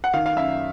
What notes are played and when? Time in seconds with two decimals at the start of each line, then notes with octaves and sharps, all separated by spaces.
0.04 F#5
0.14 D#3 F5
0.26 F5
0.37 F#2 E5